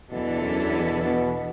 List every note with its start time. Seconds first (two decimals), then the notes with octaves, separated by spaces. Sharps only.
0.10 E2 B2 E3 D4 A4
0.42 F#2
0.72 B2
1.03 B2